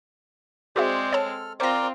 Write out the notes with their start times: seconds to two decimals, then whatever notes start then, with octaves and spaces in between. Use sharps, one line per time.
0.76 G#3 C4 F#4 G#4 C5 D5 E5
1.12 A4 C#5 A5 F6
1.60 C4 F4 A#4 C5 D5 D6 A#6